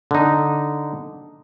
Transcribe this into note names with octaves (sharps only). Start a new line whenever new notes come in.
D3 D#4